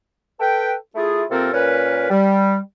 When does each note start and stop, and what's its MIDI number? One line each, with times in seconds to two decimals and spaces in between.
0.40 0.74 69
0.40 0.74 71
0.40 0.74 79
0.96 1.24 57
0.96 1.24 64
0.96 1.24 65
0.96 1.24 68
1.30 1.51 48
1.30 1.51 58
1.30 1.51 60
1.30 1.51 65
1.30 1.51 69
1.30 1.51 70
1.53 2.08 46
1.53 2.08 61
1.53 2.08 70
1.53 2.08 71
2.10 2.58 55